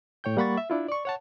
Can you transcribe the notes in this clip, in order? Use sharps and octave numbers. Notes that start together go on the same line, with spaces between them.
A2 C#5 G5 G6
G3 A#3 F#5 B5 C#6 A6
E5
D4 E4 F4
D5 C#6
C#5 F#5 A5